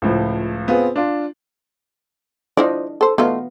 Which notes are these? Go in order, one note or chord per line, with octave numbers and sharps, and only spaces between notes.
C#2 A2 F3
B3 C4 F4 G#4
D4 F4
D4 E4 F4 C5 D5 D#5
A4 C5
A3 B3 D#4 F4 F#4 F5